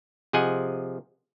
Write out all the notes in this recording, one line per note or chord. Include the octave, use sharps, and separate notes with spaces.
C3 F3 G#4 D#5 F#5 G#5